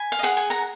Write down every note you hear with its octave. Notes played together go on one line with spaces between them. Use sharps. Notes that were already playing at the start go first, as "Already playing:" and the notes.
Already playing: G#5 B5
F5
D#5
G#4 F#5
G#5
F#5 A#5